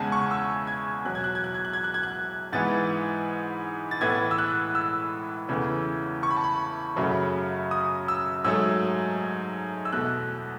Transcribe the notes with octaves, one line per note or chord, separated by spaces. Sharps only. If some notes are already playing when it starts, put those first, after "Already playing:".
Already playing: E2 C#3 G#3 F#5 G#5 A5
C#6
E6
G#6
E2 B2 F#3 F#6
G#6
F#6
G#6
F#6
G#6
F#6
G#6
F#6
G#6
F#6
G#2 E3 B3 A6
A6
A2 E3 B3 G#6
E6
F#6
E6
E2 C#3 E3 A3
C#6
B5
A5
B5
F#2 C#3 F#3 A3
D#6
E6
G#2 F#3 A3 E6
E6
E2 B2 A3 F#6